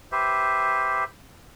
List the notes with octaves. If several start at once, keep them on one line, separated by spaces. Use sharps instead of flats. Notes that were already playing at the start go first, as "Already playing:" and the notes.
G4 B4 C5 E5